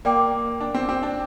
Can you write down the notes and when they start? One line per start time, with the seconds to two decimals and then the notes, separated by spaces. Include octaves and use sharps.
0.05 A#3 A#4 D5 G5 D6
0.60 D4
0.75 C4
0.89 C4
1.03 D4